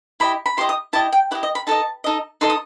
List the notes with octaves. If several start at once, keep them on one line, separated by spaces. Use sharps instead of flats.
E4 G4 D#5 B5
B5
E4 G4 D#5 C6
D#6
E4 G4 D#5 A5
G5
E4 G4 D#5 F#5
D#5
B5
D#4 A4 D#5 A5
D#4 A4 D#5
D#4 A4 D#5 C6
D#6